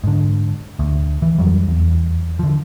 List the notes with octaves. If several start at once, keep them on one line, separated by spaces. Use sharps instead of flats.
G#2 D3
D2
E3
F2 F#3 G3
E2
D3 F3